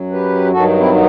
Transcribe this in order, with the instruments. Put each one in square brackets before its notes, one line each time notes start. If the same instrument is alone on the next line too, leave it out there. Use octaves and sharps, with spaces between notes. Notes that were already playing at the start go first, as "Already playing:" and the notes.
Already playing: [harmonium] F#2 F#3
G4 B4
G2 D#3 F#3 F#4 A4
C4 E4
B3 D#4